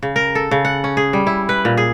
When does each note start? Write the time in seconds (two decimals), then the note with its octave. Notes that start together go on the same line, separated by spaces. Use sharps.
0.03 C#3
0.16 A#4
0.35 A4
0.51 C#3
0.65 F#5
0.84 C#4
0.97 G#4
1.13 G3
1.27 E4
1.49 B4
1.65 A#2
1.77 G#4